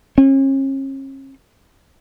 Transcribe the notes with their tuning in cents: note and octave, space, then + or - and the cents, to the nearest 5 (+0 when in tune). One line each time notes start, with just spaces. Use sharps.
C#4 -40